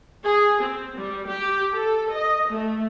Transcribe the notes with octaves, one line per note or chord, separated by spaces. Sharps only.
G#4
C4
G3
G4
A4
D#5
A3